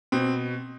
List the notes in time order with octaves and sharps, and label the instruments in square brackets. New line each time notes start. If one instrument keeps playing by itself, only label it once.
[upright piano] B2 C4